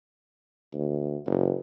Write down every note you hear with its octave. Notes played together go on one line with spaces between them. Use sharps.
D2
F#1